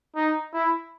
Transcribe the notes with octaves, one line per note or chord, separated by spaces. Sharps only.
D#4
E4